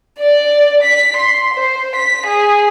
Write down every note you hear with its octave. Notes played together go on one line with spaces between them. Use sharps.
D5
B6
C6
C5
B6
G#4